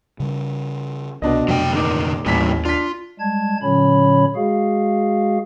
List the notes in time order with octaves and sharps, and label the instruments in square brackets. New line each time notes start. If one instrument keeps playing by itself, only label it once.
[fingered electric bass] C#3 G3
[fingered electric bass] C2 B3 [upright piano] B2 D4 D#5
[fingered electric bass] F2 C3 A3 [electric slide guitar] F#3 G5
[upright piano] D#1 D6 [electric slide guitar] D3 D#4
[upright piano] A1 B6 [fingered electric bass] D#2 [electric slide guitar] G3 A#3 E4
[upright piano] D4 B6 [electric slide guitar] F4
[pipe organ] G3 G#3 A5 G#6
A#2 D3 F#3 C#4 C#5 B5
G#3 F#4 G#4 F5